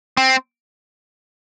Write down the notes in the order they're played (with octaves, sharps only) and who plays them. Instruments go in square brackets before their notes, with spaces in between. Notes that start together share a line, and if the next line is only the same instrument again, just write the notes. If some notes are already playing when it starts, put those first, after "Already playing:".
[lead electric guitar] C4